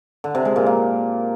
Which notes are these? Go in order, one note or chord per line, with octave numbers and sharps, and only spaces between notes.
D3
C3
G#3
A#2
A#3